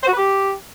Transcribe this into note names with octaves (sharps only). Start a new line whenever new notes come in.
C5
F#4
B4
G4